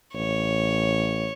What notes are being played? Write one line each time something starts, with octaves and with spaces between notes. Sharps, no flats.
A1 C#5